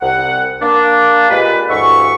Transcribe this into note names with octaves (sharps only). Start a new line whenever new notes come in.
C2 F#5
A#3 D4
A#2 G#3 A#3 G4 B4
D2 G2 E3 F#4 E5 C#6